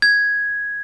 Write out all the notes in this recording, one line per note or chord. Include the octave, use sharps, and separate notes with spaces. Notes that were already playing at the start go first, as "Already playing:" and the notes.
G#6